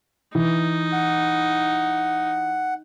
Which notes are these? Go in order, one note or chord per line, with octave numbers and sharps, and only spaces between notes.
E3 D#4
F#5